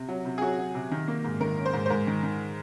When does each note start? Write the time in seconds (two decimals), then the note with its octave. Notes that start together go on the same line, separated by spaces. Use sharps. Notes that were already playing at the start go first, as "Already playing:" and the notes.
Already playing: C3
0.08 F#3
0.25 C3
0.38 G#4
0.41 F#3 F#4
0.58 F#3
0.75 C3
0.91 D#3
1.08 A#3
1.24 G#2
1.41 D#3 A#4
1.58 C#4
1.65 C5
1.73 G#2
1.86 C5
1.90 G#2 A#4
2.07 D#3
2.23 D#3